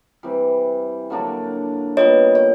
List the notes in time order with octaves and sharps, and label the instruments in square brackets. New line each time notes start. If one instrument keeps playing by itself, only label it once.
[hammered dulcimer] C3 E3 G3
D3 F#3 A#3 D4
[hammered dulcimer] A#2 G3 B3 [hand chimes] C#5 D#5
[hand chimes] C#5